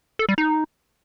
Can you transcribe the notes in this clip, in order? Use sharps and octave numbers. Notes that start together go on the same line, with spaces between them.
A4
G3
D#4